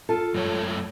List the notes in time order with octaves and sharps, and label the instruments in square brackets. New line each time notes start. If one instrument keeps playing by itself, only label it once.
[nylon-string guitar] F4 A4
[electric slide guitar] F#2 A3 C#5